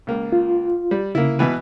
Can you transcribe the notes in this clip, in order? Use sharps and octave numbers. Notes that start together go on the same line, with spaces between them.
C#2 A#3
F4
G3
C#3 A#3 E4
B2 E3 B4